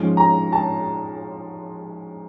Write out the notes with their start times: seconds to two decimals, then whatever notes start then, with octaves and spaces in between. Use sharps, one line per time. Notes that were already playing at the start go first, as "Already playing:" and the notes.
Already playing: G#2 F3 G#3 C#4
0.17 A#5
0.53 A5